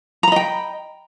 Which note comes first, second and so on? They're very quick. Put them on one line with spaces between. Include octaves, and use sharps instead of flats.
A#5 B5 D#5 G5